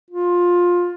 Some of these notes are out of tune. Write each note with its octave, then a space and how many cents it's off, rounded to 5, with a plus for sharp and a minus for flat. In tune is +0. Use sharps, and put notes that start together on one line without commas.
F4 +15